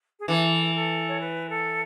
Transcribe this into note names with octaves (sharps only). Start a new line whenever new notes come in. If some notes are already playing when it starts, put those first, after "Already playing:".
G#4
E3 A4
A4
C#5
B4
A4